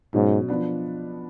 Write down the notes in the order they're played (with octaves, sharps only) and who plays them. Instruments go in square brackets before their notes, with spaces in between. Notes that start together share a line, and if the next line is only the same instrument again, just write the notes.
[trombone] G#2 [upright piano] B2 F#3 C#4
[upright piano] F3 B3 D4